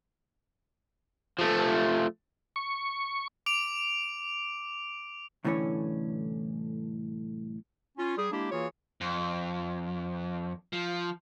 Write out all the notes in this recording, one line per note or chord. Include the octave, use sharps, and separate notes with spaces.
F3 A3
C#6
D6 D7 F7
C2 A2 D3 E3 C#4 C#5
C#4 F4
G3 G#4
G#3 A#3 D4 E4 G4
E3 A#3 F4 F#4 G#4 C#5
F2
F3